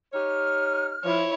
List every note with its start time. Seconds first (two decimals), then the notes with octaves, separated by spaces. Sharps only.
0.13 D#4 G4 C#5 F6
1.04 F3 E4 C#5